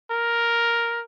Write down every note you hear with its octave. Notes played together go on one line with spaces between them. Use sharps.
A#4